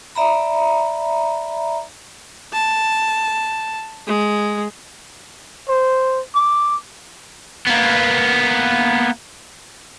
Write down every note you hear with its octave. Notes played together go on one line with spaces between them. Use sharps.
D5 E5 A#5 B5
A5
G#3
C5
D6
A#3 B3